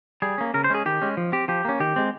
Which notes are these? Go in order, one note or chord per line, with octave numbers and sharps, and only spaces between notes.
G3 G#4
A#3 C#4
C#3 A#4
C5
G#3 C#4 G#4
D#3 G4
G#3 C#4
F3
C4 G4
F3 G4
A#3 C#4
D#3 G4
G#3 C4